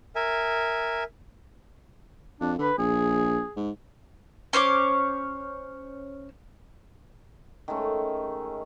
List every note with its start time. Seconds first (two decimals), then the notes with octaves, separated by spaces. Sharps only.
0.16 A#4 E5 G#5
2.41 F2 D4
2.59 D3 B4
2.78 A#1 G#4
3.57 G#2
4.53 C#4 C5 C#5 D6
7.68 D#3 G#3 A3 C#4